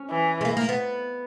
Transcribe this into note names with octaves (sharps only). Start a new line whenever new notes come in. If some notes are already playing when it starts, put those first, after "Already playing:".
Already playing: C#4
E3
G#3
A#3
A#3
B3